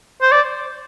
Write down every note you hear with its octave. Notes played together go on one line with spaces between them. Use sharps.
C5
D5